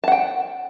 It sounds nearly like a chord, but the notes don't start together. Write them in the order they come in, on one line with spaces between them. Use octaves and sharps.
A5 F#5 G5